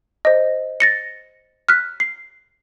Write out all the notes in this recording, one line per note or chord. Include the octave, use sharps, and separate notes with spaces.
C5 D#5
A6 A#6 C#7
F6 F#6 B6
C7